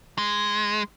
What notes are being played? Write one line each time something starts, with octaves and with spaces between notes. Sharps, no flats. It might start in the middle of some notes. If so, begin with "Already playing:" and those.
G#3